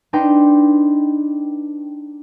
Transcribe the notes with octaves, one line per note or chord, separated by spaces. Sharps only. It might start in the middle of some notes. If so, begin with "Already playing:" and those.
D4 D#4 B4 D#5 G5 C6